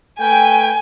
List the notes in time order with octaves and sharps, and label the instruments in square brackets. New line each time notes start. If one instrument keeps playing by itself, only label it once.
[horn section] A3 B4 G5 [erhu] G#5